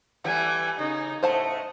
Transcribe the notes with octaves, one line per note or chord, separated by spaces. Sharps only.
E3 G3 A3 F#5 G#5
C#3 D#4
A2 A3 C5 D#5 F#5 A5